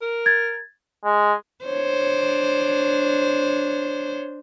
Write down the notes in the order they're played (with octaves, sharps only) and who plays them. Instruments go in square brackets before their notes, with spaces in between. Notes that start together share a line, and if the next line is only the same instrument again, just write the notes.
[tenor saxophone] A#4
[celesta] G#6 A6
[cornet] G#3
[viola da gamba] D4 C5 [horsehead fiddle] C#5